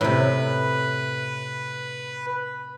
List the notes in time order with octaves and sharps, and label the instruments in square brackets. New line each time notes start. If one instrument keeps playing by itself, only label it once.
[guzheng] A2 C3 [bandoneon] B4